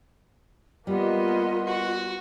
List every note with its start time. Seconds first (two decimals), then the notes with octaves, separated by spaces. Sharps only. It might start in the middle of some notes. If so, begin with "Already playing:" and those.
0.87 G3 A#3 B3 F4 D#5
1.67 F#4